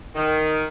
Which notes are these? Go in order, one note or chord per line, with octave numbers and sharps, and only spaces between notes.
D#3